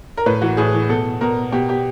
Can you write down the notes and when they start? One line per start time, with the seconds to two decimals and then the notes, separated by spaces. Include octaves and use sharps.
0.17 A#4
0.26 A2 B4
0.42 E3 F#4
0.57 A2 G#4
0.74 E3
0.89 B2 A4
1.21 B2 A#4
1.52 B2 G4
1.69 G4